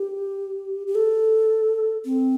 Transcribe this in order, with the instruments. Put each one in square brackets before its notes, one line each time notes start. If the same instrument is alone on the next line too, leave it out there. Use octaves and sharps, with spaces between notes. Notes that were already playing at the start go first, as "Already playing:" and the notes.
Already playing: [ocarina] G4
G4
A4
C4